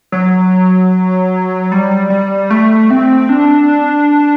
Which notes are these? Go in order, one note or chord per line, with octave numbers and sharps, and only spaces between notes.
F#3
G3
G3
A3
C4
D4